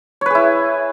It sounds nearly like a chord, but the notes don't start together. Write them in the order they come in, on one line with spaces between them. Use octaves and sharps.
C#5 B4 G#4 E4